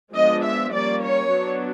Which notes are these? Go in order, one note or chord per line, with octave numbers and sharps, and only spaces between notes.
F3 G#3 B3 D4 D#5
E5
G3 A#3 C#4 D5
C#5
F#3 B3 D4